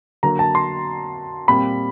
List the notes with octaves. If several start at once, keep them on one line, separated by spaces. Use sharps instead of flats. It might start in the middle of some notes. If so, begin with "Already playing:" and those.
D3 F#3 A#3 A#5
A5
C6
A#2 G3 C4 B5